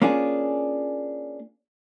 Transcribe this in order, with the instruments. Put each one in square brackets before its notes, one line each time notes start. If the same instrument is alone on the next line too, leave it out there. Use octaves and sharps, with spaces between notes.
[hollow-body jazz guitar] A#3 C#4 D4 F4 G#4